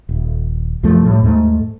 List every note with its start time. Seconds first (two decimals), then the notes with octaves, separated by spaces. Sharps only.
0.09 D#1
0.83 C2 F#2 F3 A3
1.06 A2 G3
1.23 D#2 G#2 A3